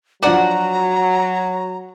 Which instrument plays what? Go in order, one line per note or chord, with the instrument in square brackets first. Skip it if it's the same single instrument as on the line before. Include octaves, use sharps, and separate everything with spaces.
[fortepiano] F3 D4 D5 [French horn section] F#3 [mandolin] F#4 F#5 [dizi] A#5